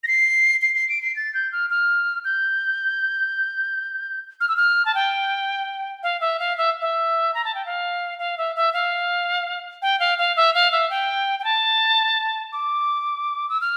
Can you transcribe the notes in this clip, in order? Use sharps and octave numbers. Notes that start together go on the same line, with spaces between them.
A#6
C7
C7
C7
D7
C7
A6
G6
F6
F6
G6
F6
E6
F6
A5
G5
F5
E5
F5
E5
E5
A#5
A5
G5
F5
F5
E5
E5
F5
G5
F5
F5
E5
F5
E5
G5
G5
A5
D6
E6
F6